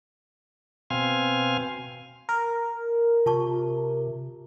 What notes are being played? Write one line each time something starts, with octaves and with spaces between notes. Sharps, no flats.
B2 C4 F5 G#5
A#4
C3 F4 A5 C#6